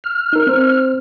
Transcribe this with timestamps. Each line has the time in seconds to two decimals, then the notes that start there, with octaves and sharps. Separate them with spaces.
0.04 F6
0.33 D#4 A#4
0.47 C4 C5